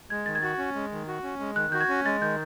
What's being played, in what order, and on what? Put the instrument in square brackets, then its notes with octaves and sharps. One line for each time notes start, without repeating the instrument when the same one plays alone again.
[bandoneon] G#3 [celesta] G#6
[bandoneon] D#3 [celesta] A6
[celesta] G#6
[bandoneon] F#4 [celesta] A6
[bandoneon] C#4
G#3
D#3
F#4
C#4
G#3
[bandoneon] D#3 [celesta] F#6
[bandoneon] F#4 [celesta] G6
[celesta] G#6
[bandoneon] C#4
[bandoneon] G#3 [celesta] A6
[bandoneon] D#3 [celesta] G6